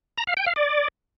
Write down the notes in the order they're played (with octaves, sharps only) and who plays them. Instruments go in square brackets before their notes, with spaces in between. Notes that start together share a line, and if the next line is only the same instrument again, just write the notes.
[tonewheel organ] A#5
F5
G5
F5
D5